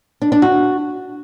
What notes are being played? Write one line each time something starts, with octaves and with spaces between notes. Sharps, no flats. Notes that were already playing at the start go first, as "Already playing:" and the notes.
D4
D4
F#4